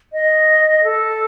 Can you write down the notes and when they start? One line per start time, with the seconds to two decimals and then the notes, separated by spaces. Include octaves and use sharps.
0.12 D#5
0.83 A4